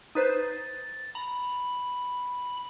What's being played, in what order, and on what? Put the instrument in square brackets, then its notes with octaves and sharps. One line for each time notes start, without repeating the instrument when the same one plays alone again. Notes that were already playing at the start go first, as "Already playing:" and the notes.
[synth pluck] D#4 B4 C5 [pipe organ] A6
[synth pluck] A#5 [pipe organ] B5